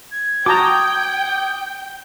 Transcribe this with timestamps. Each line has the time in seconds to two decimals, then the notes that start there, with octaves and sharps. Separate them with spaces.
0.12 G#6
0.46 F#4 G5 A5 A#5 D6 D#6